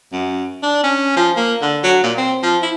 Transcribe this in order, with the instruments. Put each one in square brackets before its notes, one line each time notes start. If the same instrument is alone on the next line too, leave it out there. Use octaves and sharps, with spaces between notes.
[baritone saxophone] F#2
D4
C#4
F3
A#3
D3
F#3
A#2
C4
F3
E4